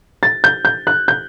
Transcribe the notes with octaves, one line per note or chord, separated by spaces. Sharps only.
A6
G6
G6
F#6
G6